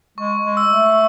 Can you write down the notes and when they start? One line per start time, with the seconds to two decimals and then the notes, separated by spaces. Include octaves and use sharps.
0.18 G#3 C#6
0.45 G#3
0.57 E6
0.70 A3